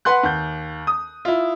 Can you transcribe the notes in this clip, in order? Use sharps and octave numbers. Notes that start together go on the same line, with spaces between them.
B4 F#5 C6 F#6
D#2 G6
D#6
E4 F4